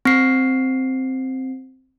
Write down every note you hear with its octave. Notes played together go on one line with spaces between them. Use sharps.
C4 C7